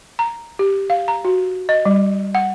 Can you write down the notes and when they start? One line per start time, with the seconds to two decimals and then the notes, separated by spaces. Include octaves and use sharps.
0.19 A#5
0.59 G4
0.90 F5
1.08 A#5
1.25 F#4
1.69 D#5
1.86 G3
2.35 F#5